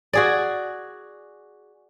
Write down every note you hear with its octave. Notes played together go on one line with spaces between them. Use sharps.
F#4 G#4 D5